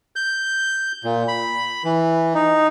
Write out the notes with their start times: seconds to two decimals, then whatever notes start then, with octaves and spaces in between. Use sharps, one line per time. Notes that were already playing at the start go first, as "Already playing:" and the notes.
0.16 G6
1.04 A#2
1.28 B5
1.84 E3
2.35 D#4